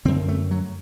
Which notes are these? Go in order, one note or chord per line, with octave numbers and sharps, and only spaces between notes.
F#2 D3 C4
A3
F#3